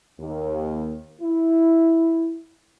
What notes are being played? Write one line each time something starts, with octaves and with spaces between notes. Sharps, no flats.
D#2
E4